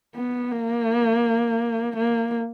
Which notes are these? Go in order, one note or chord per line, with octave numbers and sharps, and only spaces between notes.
B3
A#3
A#3